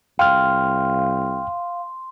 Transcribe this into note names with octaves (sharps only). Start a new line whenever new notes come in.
C2 F5 G5 C6 F6